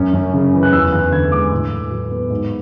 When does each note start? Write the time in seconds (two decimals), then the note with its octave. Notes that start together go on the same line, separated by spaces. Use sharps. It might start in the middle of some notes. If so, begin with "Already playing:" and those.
Already playing: F#2 C#4
0.14 F#2
0.34 C#3
0.54 E3
0.63 F#6
0.72 E2 E6
0.92 E2 F#6
1.12 D3 G#6
1.32 G#3 D6
1.52 A2
1.71 A2
1.91 F#3
2.12 B3
2.30 G#2